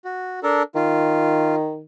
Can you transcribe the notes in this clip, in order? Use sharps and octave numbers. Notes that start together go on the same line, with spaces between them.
F#4
D4 A4 A#4
D#3 F4